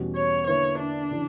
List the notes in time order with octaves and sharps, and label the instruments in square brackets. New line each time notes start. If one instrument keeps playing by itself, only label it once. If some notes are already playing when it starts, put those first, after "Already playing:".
Already playing: [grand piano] E2 B2 G3 C#4 F#4
[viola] C#5
[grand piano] D3 A#3 E4 B4 E5 [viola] C#5
[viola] D4
[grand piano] C#3 E3